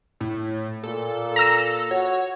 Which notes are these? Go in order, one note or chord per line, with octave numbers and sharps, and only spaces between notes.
A2
A#2 A4
A#5 E6
F#4 C#5